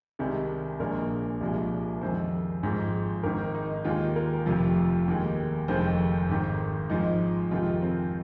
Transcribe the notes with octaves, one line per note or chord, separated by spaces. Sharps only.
C2 C3 D#3 G#3
A#1 A#2 G#3 A#4
C2 A#2 F3 G#3
F2 D#3 G#3 C5
G#1 G#2 F3 G#3
G#1 G#2 D#3 A#4
D#4
D#2 D#3 G#3 F4
A#4
F1 F2 C3 F3
D#2 D#3 G#3
F1 F2 D#3 G#3 C5
G#1 G#2 D#3
G#1 G#2 F3 G#3 D#4
F2 C3 D#3 G#3 F4
C4